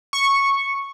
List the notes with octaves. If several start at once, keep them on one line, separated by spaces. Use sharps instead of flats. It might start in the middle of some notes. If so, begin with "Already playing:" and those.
C#6